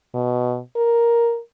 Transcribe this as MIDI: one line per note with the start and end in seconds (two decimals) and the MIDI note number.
0.15 0.59 47
0.76 1.40 70